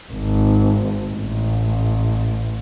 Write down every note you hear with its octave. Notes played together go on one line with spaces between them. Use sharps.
G#1
A1